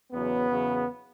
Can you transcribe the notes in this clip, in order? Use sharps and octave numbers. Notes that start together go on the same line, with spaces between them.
E2 C#3 F#3 B3
E2 C#3 F#3